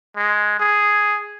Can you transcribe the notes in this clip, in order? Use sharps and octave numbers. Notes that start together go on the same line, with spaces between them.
G#3
G#4